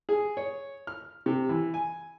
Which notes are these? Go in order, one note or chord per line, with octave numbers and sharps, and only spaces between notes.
G#4
C#5
F6
C3
E3
G#5